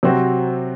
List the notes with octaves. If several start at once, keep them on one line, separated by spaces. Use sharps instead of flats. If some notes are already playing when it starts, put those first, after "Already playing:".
C3 F#3 C4 F#4